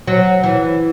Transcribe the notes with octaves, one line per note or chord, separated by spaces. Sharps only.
F#3
E3